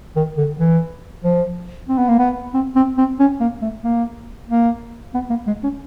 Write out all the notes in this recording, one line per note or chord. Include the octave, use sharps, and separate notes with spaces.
D#3
D3
E3
F3
C4
B3
A#3
B3
C4
C4
C4
C#4
A#3
A3
A#3
A#3
B3
A#3
G#3
C#4